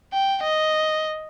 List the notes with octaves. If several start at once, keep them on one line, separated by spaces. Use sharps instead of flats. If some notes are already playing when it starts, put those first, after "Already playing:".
G5
D#5